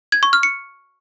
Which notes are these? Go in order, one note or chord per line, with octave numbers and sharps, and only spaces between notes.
G#6
C#6
F6
C#7